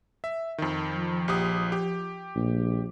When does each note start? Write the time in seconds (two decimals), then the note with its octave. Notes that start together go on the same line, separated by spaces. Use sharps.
0.24 E5
0.58 F2 D#3
0.95 F3
1.28 A#1 G4 D#6
1.72 G4
2.36 A#1